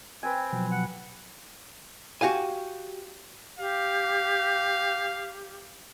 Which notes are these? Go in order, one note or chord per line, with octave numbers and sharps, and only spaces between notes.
C4 B4 G5 G#5
B2 F3 F#3
F#5
F#4 G4 F5 G#5
G4 F5